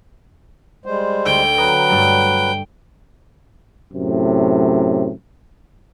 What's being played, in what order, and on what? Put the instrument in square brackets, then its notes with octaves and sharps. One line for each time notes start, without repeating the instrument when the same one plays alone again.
[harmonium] G3 G#3 C5
[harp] D2 [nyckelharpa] G5
[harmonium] F#3 B4 [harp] A#5 D#6
[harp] G2 G3 A3
[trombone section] F#2 A2 C3